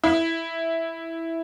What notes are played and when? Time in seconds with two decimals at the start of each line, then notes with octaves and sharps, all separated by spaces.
0.04 E4